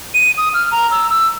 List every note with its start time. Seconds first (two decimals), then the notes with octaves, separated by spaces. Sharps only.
0.14 D#7
0.38 D#6
0.54 F6
0.72 A#5
0.91 E6
1.10 E6